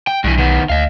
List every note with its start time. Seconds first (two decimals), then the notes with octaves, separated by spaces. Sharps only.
0.07 G5
0.24 B1 G2 E3
0.38 D#3 B3
0.70 D2 D#5 F5